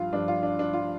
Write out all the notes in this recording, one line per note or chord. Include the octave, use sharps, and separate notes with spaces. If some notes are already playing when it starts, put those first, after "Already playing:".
Already playing: G2 F3 F4
G2 F3 D4
F4
D4
D4
F3 F4